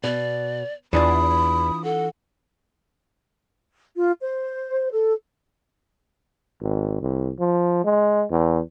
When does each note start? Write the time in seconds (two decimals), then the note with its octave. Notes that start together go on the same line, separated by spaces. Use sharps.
0.04 B2 D5
0.93 E2 E3 D4 F4 B5 D#6
1.84 A4 F#5
3.96 F4
4.22 C5
4.92 A4
6.61 G#1
7.01 C2
7.39 F3
7.84 G#3
8.30 E2